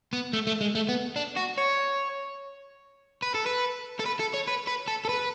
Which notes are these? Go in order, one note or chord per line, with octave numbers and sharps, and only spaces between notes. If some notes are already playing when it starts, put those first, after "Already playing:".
B3
A3
A3
G#3
A3
B3
D4
F#4
C#5
B4
A4
B4
A4
B4
A4
C#5
B4
B4
A4
A4
B4